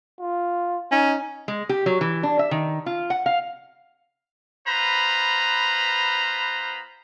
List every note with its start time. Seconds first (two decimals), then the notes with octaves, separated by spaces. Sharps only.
0.20 F4
0.91 C#4 D#4
1.48 G#3
1.69 G4
1.86 F#3
2.01 E3
2.23 D4
2.39 E5
2.51 D#3
2.86 F4
3.10 F#5
3.26 F5
4.67 B3 F4 B4 C5 A#5 B5